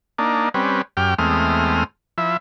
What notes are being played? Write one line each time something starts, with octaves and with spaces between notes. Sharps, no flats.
A#3 D4 D#4
G3 C4 C#4 B4
F#2 G4 G5 F6
E2 G#3 A3 C4 D#6 F6
F3 E4 E5